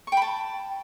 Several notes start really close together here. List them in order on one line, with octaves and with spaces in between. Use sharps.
C#6 G5 B5 A5